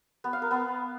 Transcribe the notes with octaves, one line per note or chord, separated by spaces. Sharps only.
B3
F5
A#4
B3